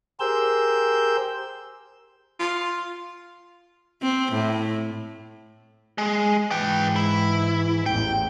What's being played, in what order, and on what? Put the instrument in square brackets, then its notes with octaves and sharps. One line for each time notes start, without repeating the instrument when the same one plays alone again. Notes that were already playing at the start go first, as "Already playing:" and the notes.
[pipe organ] G4 G#4 A#4 C5 E6 G6
[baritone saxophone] F4
[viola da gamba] C4
A2
[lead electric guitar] G#3
[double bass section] G#2 E3 [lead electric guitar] B4 G5
[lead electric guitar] E4
[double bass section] A1 E2 [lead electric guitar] G5